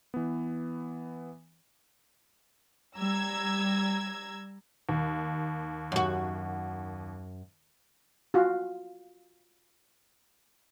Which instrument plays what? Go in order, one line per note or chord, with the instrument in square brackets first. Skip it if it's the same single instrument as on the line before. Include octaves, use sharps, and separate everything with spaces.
[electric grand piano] E3 B3
[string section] G3 A#5 E6 G#6
[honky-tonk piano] D#2
[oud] F#2 F#4
[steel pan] F4 F#4